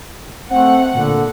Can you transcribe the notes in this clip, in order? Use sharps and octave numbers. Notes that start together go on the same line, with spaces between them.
A3 C4 F#5
A#2 D3